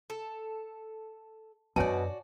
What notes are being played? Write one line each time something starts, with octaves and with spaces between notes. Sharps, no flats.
A4
F#2 B2 D4 F#4 C#5 D5 G#5 A5